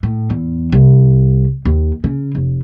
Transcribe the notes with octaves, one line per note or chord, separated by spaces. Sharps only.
A2
E2
C2
D#2
C#3
F1